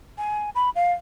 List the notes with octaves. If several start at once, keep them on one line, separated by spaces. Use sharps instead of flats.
G#5
B5
F5